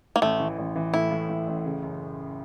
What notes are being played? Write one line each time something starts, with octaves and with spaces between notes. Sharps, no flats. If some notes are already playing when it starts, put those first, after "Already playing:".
A#3
A1 A3
E3
A1
E3
A2 E4
A2
A2
A1
C#3
F#2